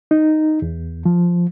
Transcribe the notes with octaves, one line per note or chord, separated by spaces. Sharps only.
D#4
E2
F3